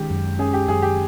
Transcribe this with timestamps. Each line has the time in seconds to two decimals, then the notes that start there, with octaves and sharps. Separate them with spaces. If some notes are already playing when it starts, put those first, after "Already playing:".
Already playing: D#3 G#3 C#4 G4
0.10 F#2
0.39 C#4 G#4
0.53 G4
0.68 F#2 G#4
0.82 G4